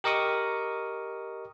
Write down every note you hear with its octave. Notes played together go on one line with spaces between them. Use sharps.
G4 A#4 D#5 C#6 D#6